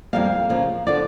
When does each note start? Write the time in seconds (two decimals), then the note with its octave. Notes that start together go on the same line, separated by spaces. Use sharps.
0.13 F2 C#3 G3 A#3 F5
0.49 C#3 F3 A#3
0.86 D3 F3 D5